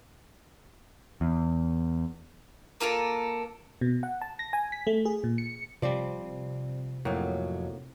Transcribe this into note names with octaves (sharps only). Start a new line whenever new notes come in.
E2
A#3 F4 A4 A#4
B2
F#5
A5
A#6
G#5
B6
A3
G#4
A#2
C#7
C3 F3 G3 C5 D5
F2 A2 F#3 A#3 F#4